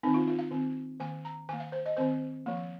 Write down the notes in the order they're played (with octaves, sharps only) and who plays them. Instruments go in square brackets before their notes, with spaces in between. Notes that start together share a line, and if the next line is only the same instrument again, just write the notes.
[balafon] D#3 C4 D#4
F4
F4
F5
D#3 C4
D#3 A#3 G#5
A#5
D#3 A#3 G#5
F5
C5
D#5
D#3 C4 C5
F3 A#3